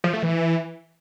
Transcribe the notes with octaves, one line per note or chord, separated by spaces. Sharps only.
F3
A3
E3